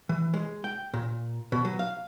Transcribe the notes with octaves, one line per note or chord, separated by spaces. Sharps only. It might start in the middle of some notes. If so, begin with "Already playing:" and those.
E3
G#3
G5
A#2
B2
F#3
F5